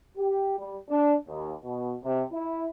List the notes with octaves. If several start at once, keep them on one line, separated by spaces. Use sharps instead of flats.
G4
G3
D4
D#2
B2
C3
E4